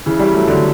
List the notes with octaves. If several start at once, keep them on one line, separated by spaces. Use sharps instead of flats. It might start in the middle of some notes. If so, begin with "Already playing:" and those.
C#3 E3
E3 G3
F#3 A3
D3 F#3